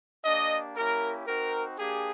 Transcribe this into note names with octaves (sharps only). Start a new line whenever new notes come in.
A#3 D4 G4 D#5
A#3 C#4 E4 G4 A#4
C4 D#4 F#4 A#4
A#3 D4 G4 G#4